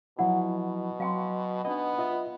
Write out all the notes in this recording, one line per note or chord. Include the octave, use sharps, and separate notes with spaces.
B2 F3 F#3 E4 F#5
F#3 F5 G5 C6
B3 D4 D#4 D5 D#5
F4 D#5 E5